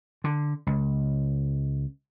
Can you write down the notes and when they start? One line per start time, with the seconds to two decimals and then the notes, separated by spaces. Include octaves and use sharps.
0.24 D3
0.67 C#2